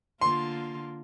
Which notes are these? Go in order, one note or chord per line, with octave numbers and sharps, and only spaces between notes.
D3 A#3 F4 C6